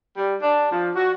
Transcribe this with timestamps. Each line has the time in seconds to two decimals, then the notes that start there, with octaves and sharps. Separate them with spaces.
0.17 G3
0.41 D4
0.71 F3
0.96 F#4